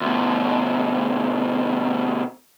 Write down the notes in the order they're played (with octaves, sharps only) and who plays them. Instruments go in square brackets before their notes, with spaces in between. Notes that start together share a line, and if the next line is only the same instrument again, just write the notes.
[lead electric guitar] D2 B2